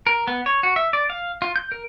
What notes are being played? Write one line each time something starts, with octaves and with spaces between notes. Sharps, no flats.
A#4
B3
C#5
F#4
E5
D5
F5
F4
G6
A#4